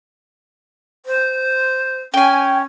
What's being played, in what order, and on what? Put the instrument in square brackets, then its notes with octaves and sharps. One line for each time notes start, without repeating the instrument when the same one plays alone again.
[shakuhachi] C5
[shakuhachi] C#4 [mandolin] G5 G#5